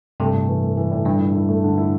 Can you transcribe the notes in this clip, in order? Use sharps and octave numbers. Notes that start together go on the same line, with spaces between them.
G2 C3 A3
A2
E3
A3
E3
A2
G2 D3
E4
E4
A3
D3
E4